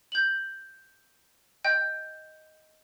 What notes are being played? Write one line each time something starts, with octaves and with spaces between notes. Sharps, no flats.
G6 F#7
D#5 G5 G6